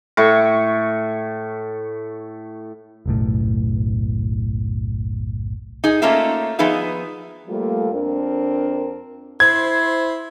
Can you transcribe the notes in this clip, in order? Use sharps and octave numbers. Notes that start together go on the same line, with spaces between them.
A2 C#6
F#1 B1 A2
D#4 G#4
A3 A#3 C#4 D#4 F4 E5
F3 B3 D#4 G#4 B4 E5
F3 G3 A3 A#3 F4
F2 C4 D4 A#4
E4 C5 G#6